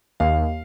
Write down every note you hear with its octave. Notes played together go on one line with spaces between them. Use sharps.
D#2 F5